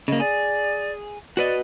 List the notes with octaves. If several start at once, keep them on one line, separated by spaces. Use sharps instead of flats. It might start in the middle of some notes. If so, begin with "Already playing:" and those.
C#3 A#3 D#5
G#4 D5
F#4 B4 D5 D#5